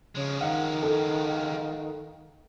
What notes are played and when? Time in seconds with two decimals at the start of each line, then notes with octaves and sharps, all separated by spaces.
0.15 C#3 F3 G#3
0.41 D#3 F5 F#5
0.83 A4